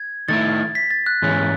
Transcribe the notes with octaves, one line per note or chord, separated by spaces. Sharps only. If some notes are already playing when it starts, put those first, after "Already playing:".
Already playing: G#6
D#3 A3 E4 A6
B6
A6
F#6
G#2 E3 G#3 C#4